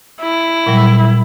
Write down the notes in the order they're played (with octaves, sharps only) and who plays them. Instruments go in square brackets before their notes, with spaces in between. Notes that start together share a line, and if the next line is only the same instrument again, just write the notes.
[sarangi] E4
[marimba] A#2 F#3 G3